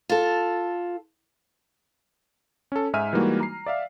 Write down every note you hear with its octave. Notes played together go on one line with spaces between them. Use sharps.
F4 A4
C#4 A4
G#2 D#4 E5 G#5 F6 D#7
E3 G3 G#3 A#3 D#4 F#4
A#5 C7
D5 E5 F5